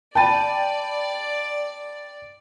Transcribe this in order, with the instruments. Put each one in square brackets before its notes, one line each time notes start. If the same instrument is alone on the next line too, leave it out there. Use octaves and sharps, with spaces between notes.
[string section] D5 [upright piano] G5 B5 A6 [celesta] A5 D#7